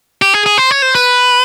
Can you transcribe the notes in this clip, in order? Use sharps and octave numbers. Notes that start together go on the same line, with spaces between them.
G4
G#4
G#4
C5
C#5
C5
B4